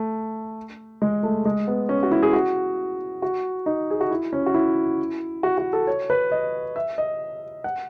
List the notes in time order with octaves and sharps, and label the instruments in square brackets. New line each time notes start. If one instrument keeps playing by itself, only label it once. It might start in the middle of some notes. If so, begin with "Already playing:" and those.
Already playing: [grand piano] A3
G#3
A3
G#3
B3
C#4
F#4
E4
G#4
F#4
F#4
D#4
G#4
F#4
E4
C#4
F#4
E4
F#4
F#4
A4
C#5
B4
D#5
E5
D#5
F#5